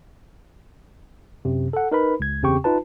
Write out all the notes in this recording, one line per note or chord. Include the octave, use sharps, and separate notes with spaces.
F#2 C3
A4 F#5
D#4 A#4 B4 B5
C#2 G#6
E2 C#3 C4 G4 G5 C#6
D#4 F4 B4 A5